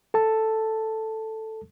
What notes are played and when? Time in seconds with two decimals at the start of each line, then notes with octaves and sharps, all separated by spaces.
0.14 A4 A5